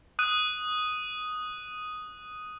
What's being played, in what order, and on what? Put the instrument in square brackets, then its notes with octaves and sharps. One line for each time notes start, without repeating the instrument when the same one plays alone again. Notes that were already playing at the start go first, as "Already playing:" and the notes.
[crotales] D#6 F#6 D#7